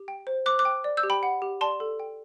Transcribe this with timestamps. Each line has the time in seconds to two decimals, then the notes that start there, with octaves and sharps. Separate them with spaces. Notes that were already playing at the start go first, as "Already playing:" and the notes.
Already playing: G4
0.08 G5
0.27 C5
0.46 C5 D6 F#6
0.59 D6 F#6
0.65 G5
0.84 D5
0.97 E6 G6
1.03 G4
1.10 G5 B5
1.23 F#5
1.42 G4
1.61 D5 A5 C6
1.80 A4
2.00 G5